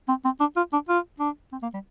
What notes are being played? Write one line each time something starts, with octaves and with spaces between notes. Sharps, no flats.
C4
C4
D4
F4
D4
F4
D4
C4
A#3
G3